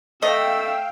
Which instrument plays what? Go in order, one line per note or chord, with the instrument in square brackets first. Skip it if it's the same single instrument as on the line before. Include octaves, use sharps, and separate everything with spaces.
[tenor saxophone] A3 [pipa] D#5 [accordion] F5 G5 [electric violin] E6